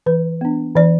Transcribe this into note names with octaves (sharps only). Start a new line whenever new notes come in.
E3 B4
B3 D4
E3 D5